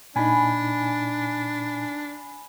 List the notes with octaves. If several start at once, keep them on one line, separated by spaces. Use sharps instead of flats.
A#2 D4 D#4 G#5 B5